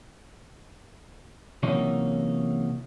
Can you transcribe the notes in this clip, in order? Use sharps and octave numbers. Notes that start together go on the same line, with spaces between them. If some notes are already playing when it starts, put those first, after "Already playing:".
C3 E3 F#3 A#3 C#4 D#4